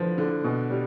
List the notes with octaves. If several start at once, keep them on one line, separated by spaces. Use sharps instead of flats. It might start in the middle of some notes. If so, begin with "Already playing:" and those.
Already playing: D3 F3 B4
D3
B2
G3